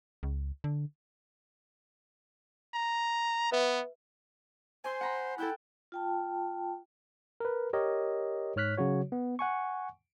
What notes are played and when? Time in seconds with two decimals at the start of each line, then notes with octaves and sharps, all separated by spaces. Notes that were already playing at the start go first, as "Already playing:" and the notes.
0.23 C#2
0.64 D3
2.74 A#5
3.52 B3 B4 E5
4.84 C5 G#5 C6
5.01 F#5 A#5 B5
5.38 E4 A4 G5 F#6
5.92 F4 G5 A5
7.40 A#4 B4
7.73 G4 A#4 C#5 D#5
8.56 G#2 C#5 F6 F#6 B6
8.78 C#3 F#3 F#4 C#5
9.12 B3
9.39 F#5 G#5 C#6